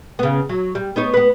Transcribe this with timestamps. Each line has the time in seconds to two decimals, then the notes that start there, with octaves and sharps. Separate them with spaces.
0.19 C#3 B3
0.49 F#3
0.75 G3
0.96 B3 D#4 C#5
1.14 B3 B4